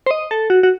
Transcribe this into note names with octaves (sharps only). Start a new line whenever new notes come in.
C5
D#5
A4
F#4
F#4